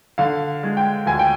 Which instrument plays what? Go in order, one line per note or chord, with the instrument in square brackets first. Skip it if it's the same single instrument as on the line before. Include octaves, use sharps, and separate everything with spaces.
[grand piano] D3 F5
G#3
G5
D2 G#5
G5